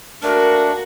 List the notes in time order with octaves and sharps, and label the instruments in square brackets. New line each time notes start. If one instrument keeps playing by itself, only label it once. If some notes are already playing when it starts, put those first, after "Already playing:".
[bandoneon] A3 D4 [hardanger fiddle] A#3 F#4 [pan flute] A#4